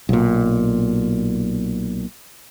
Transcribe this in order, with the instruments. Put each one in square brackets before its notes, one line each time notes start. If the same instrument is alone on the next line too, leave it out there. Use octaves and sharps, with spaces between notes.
[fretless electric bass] B1 A#2